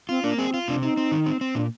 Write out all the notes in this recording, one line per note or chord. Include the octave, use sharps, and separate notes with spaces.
C4 F4
A#3 D4
C4 G#4
F4
C3 D4
C4 D#4
C4
D#3
C4
C4
A#2 D4